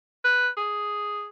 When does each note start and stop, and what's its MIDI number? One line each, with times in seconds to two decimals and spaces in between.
0.24 0.49 71
0.57 1.27 68